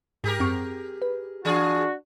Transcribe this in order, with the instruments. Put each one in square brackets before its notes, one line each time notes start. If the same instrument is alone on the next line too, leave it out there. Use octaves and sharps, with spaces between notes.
[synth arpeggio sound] G#2 B6 [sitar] G4 G#4 A#4
[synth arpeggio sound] F#2 C4 C#6
B4
[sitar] E3 F4 G#4 [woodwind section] D4 F#4